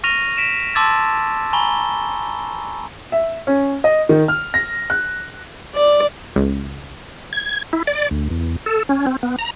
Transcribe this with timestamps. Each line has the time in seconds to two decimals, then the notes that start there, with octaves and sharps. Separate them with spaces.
0.04 C#6 F6 A#6 D#7 F7
0.37 B6 D7 E7
0.75 A5 C6 D6 E6 G#6 A6
1.53 G#5 A#5 B5 C#6 G7
3.12 E5
3.47 C#4
3.84 D#5
4.09 D#3
4.28 F6
4.54 A#6
4.90 F#6
5.75 D5
6.36 C#2
7.33 G#6
7.73 E4
7.87 D5
8.11 D2
8.30 E2
8.66 A4
8.89 C#4
9.07 C4
9.23 B3
9.39 A#5